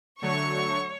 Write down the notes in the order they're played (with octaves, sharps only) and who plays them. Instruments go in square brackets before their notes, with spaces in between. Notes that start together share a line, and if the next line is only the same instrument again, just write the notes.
[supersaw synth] D3 F#3 A3 [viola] C#5 [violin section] C#6